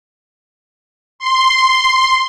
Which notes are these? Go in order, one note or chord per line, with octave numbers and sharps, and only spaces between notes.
C6